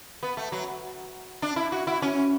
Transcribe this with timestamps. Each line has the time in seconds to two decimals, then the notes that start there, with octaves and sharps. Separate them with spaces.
0.23 B3
0.37 A3
0.52 F#3
1.42 D4
1.56 E4
1.72 F#4
1.87 E4
2.02 C#4